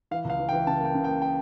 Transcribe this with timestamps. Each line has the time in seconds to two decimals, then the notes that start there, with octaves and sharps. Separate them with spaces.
0.11 E3 F5
0.24 C#2
0.30 F5
0.39 E3
0.49 G5
0.53 E3
0.67 C#3 A5
0.80 A#3 G5
0.94 C#3
1.04 G5
1.08 A#3
1.22 A#3 G5